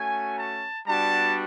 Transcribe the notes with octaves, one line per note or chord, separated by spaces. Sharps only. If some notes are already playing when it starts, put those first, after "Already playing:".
Already playing: A3 C#4 F#4 G#5
A5
G3 B3 D4 F#4 A5